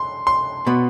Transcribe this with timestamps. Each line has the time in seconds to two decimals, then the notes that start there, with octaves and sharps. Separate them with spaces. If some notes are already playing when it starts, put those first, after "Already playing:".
Already playing: C6
0.27 C6
0.67 B2 B3